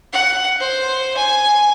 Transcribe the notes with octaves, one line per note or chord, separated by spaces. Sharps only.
F#5
C5
G#5